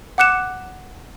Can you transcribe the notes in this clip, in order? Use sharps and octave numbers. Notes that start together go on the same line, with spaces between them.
F#5 D6 F#6 C#7 E7